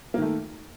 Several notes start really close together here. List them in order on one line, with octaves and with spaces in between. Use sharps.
A#3 D#3 A3